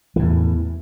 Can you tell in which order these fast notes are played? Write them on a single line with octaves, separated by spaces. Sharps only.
E3 A2 E2